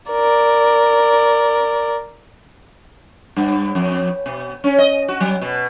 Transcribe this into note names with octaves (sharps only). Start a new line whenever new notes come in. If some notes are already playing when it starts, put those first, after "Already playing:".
A#4 D5
G2
F2
B2
C#4
D#5
F#4
F#3
B2